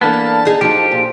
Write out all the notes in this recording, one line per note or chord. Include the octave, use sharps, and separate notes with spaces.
E3 A#3 B3 D4 A4 A5
D#4 G#4
F3 D#4 F#4 G4 A4
A#2